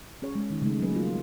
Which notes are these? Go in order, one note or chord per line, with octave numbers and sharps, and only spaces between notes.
C#4 G#4 C#5
G#3
D#3 D#4
C#3 G#3 A3 C4 D#4
F#3 G3 A#3 G#4 B4
A#3 F4